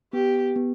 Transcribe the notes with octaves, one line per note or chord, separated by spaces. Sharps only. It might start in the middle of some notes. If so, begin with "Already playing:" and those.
B3 G4
B3